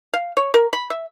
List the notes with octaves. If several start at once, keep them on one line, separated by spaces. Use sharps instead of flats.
F5
C#5
A#4
B5
E5